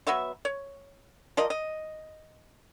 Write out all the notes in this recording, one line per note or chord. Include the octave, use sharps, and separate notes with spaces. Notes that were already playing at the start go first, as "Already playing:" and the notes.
F#3 B3 E5 C#6
C#5
F3 A#4 D5 D#5
D#5